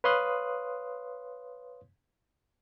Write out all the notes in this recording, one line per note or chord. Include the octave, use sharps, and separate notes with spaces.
B4 C#5 F5 C6 D#6 F#6